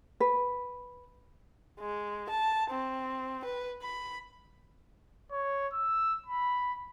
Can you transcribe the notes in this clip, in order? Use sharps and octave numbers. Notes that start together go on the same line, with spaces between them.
B4
G#3
A5
C4
B4
B5
C#5
E6
B5